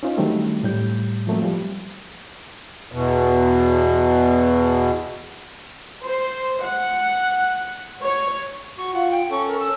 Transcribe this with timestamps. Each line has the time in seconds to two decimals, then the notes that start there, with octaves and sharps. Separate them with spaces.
0.03 C#4 D#4 F4 C5
0.17 D#3 F#3 G3 A3 C4 D4
0.63 A2 G3 G6
1.27 F3 F#3 A3 A#3 C4
1.43 F3 G3
2.92 E2 B2
6.04 C5
6.64 F#5
8.02 C#5
8.78 F#4 C#6
8.94 F4 F#5
9.11 G5
9.30 C#4 A4 C#6
9.47 A#4
9.60 E6